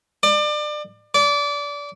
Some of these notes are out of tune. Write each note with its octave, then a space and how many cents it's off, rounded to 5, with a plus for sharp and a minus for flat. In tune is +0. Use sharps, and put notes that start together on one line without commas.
D5 +30
D5 -25